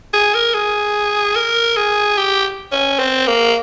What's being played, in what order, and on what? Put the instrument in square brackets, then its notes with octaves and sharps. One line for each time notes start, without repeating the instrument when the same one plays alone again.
[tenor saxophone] G#4
A#4
G#4
A#4
G#4
G4
C#4
C4
A#3